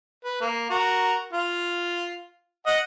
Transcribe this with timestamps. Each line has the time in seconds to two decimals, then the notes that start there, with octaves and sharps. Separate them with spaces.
0.25 B4
0.41 A#3
0.70 F#4 A#4
1.33 F4
2.66 D#5 F#5